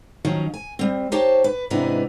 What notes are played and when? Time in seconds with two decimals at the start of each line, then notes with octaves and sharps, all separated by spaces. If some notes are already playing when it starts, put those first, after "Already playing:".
0.25 D#3 F3 F#3 C#4 D#4
0.54 G#5
0.79 G3 C4
1.12 D#4 G4 C5 C#5 A5
1.44 B4
1.70 G#2 C3 E3 B3 D4 D#4